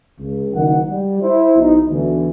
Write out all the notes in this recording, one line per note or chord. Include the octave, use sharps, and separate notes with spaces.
C#2
F#1 D#3 F#5
G3
E4 C5
B1 D#4
D2 B2 D3 E3